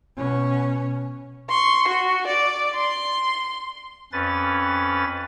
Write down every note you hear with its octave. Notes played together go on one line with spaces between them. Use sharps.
B2 C#4
C6 C#6
F#4
D5
C6
F2 C#4 B4 A6